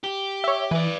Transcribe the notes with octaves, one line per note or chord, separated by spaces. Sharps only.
G4
C#5 E5
E3 B4 D5